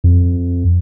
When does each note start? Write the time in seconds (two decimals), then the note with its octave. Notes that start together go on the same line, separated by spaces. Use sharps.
0.04 F2